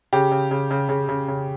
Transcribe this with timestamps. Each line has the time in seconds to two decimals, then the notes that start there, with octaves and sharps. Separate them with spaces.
0.13 C#3 G4
0.31 C#3
0.51 C#3
0.71 C#3
0.89 C#3
1.09 C#3
1.28 C#3